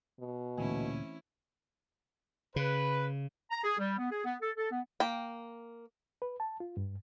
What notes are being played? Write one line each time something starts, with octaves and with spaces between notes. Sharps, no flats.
B2
D2 A#2 E3 A3 C4 C#4 E4
C#3 B4
A#5
G#4
G3
B3
G#4
B3
A4
A4
B3
A#3 G5
B4
A5
F4
G2